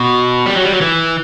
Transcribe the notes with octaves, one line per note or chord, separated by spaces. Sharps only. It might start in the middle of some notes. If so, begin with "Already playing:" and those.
Already playing: B2
G3
F#3
G3
F#3
E3